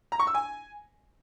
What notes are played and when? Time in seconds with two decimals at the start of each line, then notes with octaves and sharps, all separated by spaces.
0.12 A#5
0.19 C#6
0.27 E6
0.35 G#5